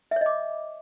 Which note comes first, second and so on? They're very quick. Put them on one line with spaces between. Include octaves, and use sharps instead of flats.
E5 C#5 D#5 D6